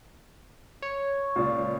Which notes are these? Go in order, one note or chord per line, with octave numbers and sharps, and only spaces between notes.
C#5
C#2 A#2 D5